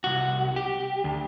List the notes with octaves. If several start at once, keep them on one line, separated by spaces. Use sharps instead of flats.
C2 F#4
G4
D2